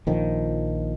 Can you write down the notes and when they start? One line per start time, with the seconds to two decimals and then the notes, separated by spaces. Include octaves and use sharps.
0.07 A#1 D#3 F3